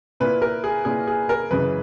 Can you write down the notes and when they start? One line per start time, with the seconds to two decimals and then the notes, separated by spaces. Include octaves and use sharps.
0.20 A#2 A#3 E4 B4
0.42 A#4
0.64 G#4
0.85 A#2 A#3 E4 G#4
1.07 G#4
1.29 A#4
1.51 F#2 C#3 E3 G#3 B4